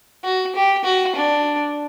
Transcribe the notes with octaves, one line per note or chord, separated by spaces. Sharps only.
F#4
G4
F#4
D4